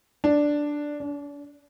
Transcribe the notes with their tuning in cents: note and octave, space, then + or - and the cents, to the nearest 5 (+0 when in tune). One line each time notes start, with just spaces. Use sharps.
D4 +0
D4 -40